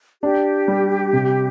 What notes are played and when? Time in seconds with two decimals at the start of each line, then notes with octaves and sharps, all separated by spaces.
0.23 D4 G4
0.68 G3
1.13 C3